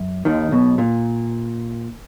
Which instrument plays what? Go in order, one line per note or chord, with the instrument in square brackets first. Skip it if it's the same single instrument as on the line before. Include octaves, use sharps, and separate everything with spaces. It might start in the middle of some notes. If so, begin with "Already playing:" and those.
Already playing: [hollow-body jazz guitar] F#2
D#2 D#3
B1 B2
A#2